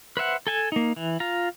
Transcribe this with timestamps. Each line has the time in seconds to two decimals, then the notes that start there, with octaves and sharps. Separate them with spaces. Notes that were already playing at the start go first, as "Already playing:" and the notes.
0.17 B4 C5 E5 F#5
0.47 A4 G#5 A5
0.72 A#3 D#4
0.96 E3
1.20 F4 A#5